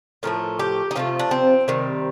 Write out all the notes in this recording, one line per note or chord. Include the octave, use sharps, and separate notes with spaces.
A2 F3 A3 A#4
G4
D#4
C3 F3 A3 F4
D4
C4
C3 D#3 G3